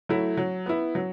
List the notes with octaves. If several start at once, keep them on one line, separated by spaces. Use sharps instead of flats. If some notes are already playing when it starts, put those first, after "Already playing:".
F#3 A3 E4
F#3
B3 E4
F#3